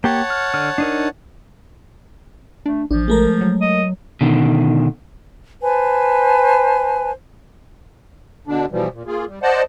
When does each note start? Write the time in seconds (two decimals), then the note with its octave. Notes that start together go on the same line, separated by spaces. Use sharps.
0.04 A#3 G4 C#5 F#5 A5
0.30 F6
0.54 D3 F6
0.78 D4 D#4 A#4
2.66 A3 D4
2.91 A1 F3 D4
3.08 G#3 A3 A#4
3.41 F#3
3.62 D#5
4.21 B2 D3 D#3
5.62 B4 C5 G#5 A5
8.47 B2 D3 D4
8.71 B2 E3 F3 G3
8.93 A#2
9.06 A#3 F4 G#4
9.27 G3
9.42 C5 D5 D#5 F#5 A5